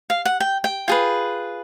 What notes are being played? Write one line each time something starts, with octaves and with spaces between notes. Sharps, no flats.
F5
F#5
G5
G5
F4 G#4 B4